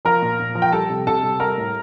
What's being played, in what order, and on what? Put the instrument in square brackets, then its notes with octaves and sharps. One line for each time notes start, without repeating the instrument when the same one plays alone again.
[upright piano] F3 A#4 A#5
A#2
A#2
F3
G5
G3 A4 A5
C3
C3 A4 A5
G3
G3 A#4 A#5
A2